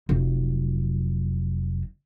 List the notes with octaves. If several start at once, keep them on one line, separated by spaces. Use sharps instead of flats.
F1 F#3